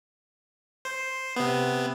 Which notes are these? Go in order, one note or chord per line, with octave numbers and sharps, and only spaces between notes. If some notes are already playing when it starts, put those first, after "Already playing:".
C5
C3 B3